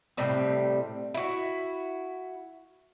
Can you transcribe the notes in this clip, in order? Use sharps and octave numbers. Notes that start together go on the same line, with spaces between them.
A2 C3 G3 C4
E4 F#4